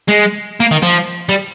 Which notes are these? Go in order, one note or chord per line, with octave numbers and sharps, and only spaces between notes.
G#3
A#3
D#3
F3
G3